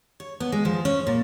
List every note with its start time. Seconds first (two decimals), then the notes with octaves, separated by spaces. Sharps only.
0.20 C#5
0.40 B3
0.52 G#3
0.65 F3
0.85 C#4
1.07 A#2